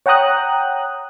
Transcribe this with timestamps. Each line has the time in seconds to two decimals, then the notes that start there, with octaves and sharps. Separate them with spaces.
0.06 C#5 F#5 G5 A#5 D#6 F#6